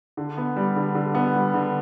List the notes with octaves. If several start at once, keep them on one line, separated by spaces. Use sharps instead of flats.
D3
B3
G3
D3
D3
B3
G3
D3